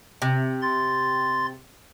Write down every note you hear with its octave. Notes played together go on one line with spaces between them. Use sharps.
C3
C6 A6